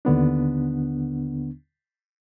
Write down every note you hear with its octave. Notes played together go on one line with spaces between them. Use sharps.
D#2 D3 B3 D4